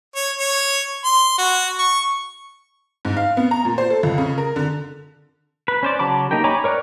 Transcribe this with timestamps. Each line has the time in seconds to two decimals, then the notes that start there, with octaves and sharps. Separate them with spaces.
0.16 C#5
0.38 C#5
1.05 C6
1.38 F#4
1.79 C#6
3.05 G#2
3.17 F5
3.37 B3
3.51 A#5
3.65 A#2
3.78 C5
3.90 A4
4.03 C#2
4.18 C#3
4.38 A#4
4.56 D3
5.68 B4
5.83 C#4 C5 D5
5.99 C#3 F#3 A5 B5 D6
6.31 A#3 D#4 G4 A#4 G5
6.44 C#5 G#5 A#5 B5 D6
6.64 A#4 C#5 D5 G5 F#6